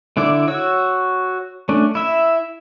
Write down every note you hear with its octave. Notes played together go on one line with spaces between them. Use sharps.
D3 D4 E4 D5
F#4 C#5 E6
A3 C#4 D4
E4 E5